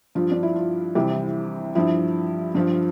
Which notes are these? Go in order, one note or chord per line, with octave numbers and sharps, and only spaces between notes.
G2 F3 F4
D4
E4
F4
C2 C3 E3 G4
G2 F3 E4
G2 F3 F4